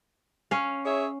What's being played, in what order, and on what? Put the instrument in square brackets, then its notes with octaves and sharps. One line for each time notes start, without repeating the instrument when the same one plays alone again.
[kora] C#4 F5
[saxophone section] G#4 C#5 E5